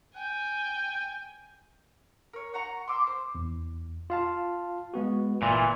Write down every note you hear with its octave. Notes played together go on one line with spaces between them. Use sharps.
G5 G#5
A#4 C#5
F#4 F#5 A#5 C#6
C6 D6 E6
C5
E2
F4 F5 A5
G#3 B3 F#4
G1 A#2 E3 C6